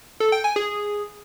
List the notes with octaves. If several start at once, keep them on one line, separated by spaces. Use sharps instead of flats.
A4
G5
G#5
G#4